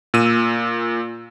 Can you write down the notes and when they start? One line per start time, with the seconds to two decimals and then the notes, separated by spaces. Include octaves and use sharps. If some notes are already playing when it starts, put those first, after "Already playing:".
0.14 A#2 E6 D#7